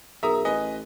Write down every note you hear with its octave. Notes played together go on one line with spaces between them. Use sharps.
B1 G#4 A#4 E5 A#5 D#6
A1 B4 D#5 G#5